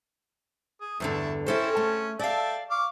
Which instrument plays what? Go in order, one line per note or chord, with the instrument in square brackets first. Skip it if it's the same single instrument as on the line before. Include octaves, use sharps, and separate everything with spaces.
[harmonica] G#4
[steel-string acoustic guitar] E2 G2 D3 [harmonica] A3 E4
[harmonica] C4 C#4 [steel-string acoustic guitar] E4 A4 C5
[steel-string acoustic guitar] A3
[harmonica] A4 E5 G5 [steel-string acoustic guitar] D5 F5
[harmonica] F5 C#6 D6